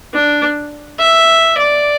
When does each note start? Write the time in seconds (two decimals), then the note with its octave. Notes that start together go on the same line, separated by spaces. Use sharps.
0.14 D4
0.99 E5
1.58 D5